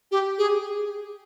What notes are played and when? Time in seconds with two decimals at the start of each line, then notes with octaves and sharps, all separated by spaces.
0.12 G4
0.38 G#4